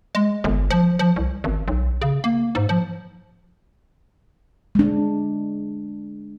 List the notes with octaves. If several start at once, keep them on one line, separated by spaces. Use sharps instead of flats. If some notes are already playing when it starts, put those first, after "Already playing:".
G#3
G1
F3
F3
C2
G#1
B1
C#3
A#3
G#2
F3
G#3 D4